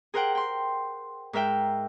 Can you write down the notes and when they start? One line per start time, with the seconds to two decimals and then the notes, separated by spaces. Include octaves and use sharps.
0.14 G#4 A#4 C5 F#5 G5
0.35 G5 C6
1.33 G#2 A#4 E5 G5